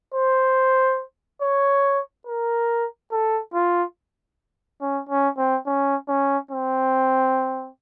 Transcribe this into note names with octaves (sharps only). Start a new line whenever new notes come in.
C5
C#5
A#4
A4
F4
C#4
C#4
C4
C#4
C#4
C4